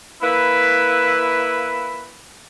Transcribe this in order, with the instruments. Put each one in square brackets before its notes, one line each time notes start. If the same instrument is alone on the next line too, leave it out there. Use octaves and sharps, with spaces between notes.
[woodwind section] A#3 E4 B4